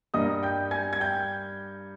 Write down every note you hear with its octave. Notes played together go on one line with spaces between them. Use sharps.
G2 G3 A#3 D#5 D#6
G5 G6
G#5 G#6
G#6
G5 G6